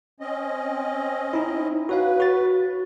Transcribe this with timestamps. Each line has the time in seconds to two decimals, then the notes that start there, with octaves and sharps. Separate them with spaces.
0.20 C4 C#4 D#5
1.33 D#4 E4
1.89 F#4 B4 C#5 F5
2.20 F#4 A6